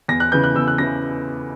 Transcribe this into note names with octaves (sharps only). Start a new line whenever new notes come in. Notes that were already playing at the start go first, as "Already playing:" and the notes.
E2 A#6
F#6
C#3 E3 B3 G6
F#6
E2 E6
F#6
C#3 E3 B3 A#6